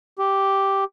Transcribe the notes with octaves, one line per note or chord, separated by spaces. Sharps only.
G4